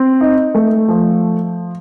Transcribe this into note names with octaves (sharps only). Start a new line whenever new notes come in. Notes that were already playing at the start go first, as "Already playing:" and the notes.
Already playing: C4
D#4
A3
F3